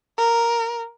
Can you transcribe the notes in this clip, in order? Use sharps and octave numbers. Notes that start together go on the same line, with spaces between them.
A#4